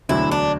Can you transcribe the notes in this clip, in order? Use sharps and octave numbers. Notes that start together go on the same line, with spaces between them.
E1 D2 D3 F#3 E4
D4